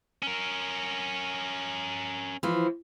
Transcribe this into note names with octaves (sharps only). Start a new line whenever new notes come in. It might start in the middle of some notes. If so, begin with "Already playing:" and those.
C#4 A#4
E3 F3